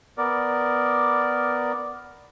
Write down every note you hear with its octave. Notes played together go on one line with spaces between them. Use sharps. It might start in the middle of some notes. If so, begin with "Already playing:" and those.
B3 A#4 D5